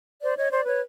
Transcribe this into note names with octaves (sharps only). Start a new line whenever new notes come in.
C5 D5
C#5 D#5
C5 D5
B4 C#5